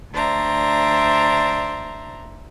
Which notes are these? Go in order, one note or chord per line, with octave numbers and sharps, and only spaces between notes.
D2 D4 C5 E5 A#5